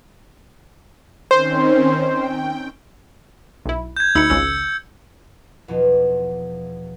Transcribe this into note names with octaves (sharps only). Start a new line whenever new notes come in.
D#3 C4 C#4 C5
G5
B1 E4
G6 G#6
D2 D#4 B5 E6 C#7
G#1 C#2 C#3 E6
E2 B2 F3 F4